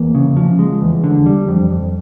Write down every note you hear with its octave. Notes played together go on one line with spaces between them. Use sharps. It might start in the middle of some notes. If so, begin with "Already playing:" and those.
Already playing: E2 A#3
C#3
F3
G#3
E2
D3
G3
F2
F2